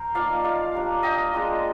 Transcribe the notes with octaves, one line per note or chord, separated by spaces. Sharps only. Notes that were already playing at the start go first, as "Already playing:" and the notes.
Already playing: A#4 C5
F3 A#3 D#4 D5 F5
D5 F5
G3 A#3 D4
D#5 G5
G#3 D4 F4